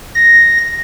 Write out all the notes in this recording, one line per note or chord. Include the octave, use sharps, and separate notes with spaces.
A#6